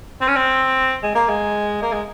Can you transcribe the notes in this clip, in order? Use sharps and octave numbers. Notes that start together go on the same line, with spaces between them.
C4
C#4
C4
G#3
A#3
G#3
A#3
G#3